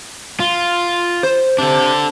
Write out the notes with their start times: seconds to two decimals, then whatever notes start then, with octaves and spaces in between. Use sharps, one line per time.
0.40 F4
1.23 C5
1.58 C3 D4 A4